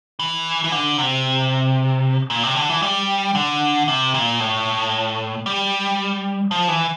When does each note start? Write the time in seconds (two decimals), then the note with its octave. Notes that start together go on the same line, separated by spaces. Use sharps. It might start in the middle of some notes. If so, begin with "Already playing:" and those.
0.19 E3
0.64 E3
0.72 D3
0.98 C3
2.30 A#2
2.43 C3
2.56 D3
2.69 E3
2.82 G3
3.35 D3
3.88 C3
4.14 A#2
4.40 A2
5.46 G3
6.51 F3
6.68 E3